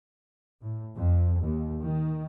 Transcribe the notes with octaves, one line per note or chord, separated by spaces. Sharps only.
A2
F2
D#2
D#3